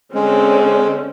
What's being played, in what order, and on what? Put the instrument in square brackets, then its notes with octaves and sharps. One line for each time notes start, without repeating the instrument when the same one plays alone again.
[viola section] D3 C4 C#4 [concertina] G#3